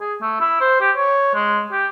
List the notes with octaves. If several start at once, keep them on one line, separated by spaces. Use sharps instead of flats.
G#4
A3
E4
C5
G4
C#5
G#3
G4